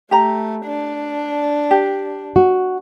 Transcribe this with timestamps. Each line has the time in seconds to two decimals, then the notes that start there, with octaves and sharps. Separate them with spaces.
0.11 A3 G4 A#5
0.65 D4
1.71 G4
2.36 F#4